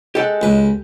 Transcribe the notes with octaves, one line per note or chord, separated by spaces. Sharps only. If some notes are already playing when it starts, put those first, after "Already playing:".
G#3 G4 A4 F#5
C#2 B4